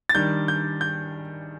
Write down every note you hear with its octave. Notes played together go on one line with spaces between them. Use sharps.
A6
D#3 G3 D4 G6
G6
G6